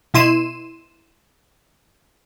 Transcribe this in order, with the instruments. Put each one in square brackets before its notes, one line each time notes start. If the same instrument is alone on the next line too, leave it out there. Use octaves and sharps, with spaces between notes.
[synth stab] B2 E4 C6 D#7 E7